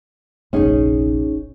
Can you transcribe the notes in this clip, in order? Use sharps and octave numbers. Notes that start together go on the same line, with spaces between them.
F1 A#1 C#4 D#4 G#4